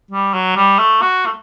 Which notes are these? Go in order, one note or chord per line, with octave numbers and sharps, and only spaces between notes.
G3
F#3
G3
A3
F#4
A3